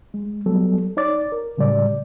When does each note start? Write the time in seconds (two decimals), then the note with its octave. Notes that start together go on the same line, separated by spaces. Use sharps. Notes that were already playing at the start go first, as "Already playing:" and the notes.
0.14 G#3
0.46 F#3 G3 B3 A4
0.97 D#4 C#5 D5 D6 A6
1.32 A#4
1.57 A2 C#3 G3 G#3 D5